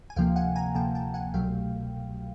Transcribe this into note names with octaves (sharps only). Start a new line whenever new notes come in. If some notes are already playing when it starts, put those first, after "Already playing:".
G#5
D2 C3 F3 A#3 F5 G5
F#5 G#5
G#5 A#5
D2 C3 F3 A#3 G5 A5
G5 A5
F#5 G#5
C2 B2 F#3 A3 F5 G5